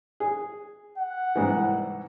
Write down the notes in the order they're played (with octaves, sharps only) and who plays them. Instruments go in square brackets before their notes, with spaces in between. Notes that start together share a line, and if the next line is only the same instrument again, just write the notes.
[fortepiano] G#4
[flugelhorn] F#5
[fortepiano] C2 G#2 E3